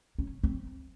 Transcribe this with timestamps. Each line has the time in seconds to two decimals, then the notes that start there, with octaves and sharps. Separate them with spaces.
0.19 C#4
0.44 C4